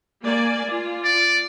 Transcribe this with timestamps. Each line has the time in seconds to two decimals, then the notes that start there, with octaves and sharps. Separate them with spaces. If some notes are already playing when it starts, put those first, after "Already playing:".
0.24 A#3 D5 G#5
0.68 F4
1.04 D5